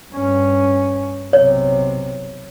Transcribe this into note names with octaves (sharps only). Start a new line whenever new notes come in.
G2 C#4
B1 C3 C#5